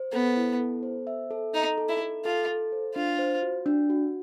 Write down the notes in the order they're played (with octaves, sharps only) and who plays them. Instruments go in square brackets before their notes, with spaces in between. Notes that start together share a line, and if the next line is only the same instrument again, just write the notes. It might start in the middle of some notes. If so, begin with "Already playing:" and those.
Already playing: [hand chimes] C5
[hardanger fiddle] B3 [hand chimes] A4
[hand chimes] E4
A4
C5
E5
A4
[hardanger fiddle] D#4 [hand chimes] A4
[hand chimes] A4
[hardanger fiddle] E4
[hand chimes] A4
[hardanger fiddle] F4 [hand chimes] A4
[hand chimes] A4
C5
[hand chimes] D4 [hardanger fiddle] F4
[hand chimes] C5
F#4
D4
F#4